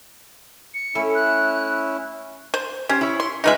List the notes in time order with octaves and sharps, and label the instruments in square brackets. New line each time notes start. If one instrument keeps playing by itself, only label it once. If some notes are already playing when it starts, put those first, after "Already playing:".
[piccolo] C#7
[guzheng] A3 [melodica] C#4 E4
[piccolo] F#6
[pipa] C5
[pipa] C#4 [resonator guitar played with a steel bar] G4 C5
[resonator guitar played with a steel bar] E4 C#5
[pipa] C6
[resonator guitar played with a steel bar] G#3 F4 F#5 [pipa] D#4 B4 E5